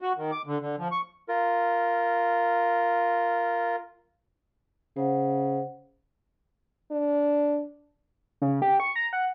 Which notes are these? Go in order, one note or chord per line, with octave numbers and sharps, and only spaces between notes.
F#4
D#3
D6
D3
D3
F3
C#6
F4 A#4
C#3 C5 F#5
D4
C#3
G4
C#6
A#5
F#5